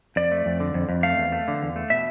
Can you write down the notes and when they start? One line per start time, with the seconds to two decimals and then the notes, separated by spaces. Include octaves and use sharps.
0.16 F2 D5
0.32 A3
0.46 F2
0.60 D3
0.74 F2
0.89 F2
1.03 A3 F5
1.18 E2
1.32 A3
1.48 D3
1.62 E2
1.76 A3
1.90 B2 E5